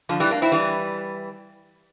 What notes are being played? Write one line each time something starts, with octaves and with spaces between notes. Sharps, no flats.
D3 F3
E3 G3
A#3 D4
C4 E4
E3 G3